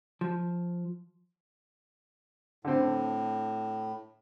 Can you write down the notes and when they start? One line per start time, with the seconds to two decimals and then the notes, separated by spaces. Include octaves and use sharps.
0.21 F3
2.65 A2 D3 C4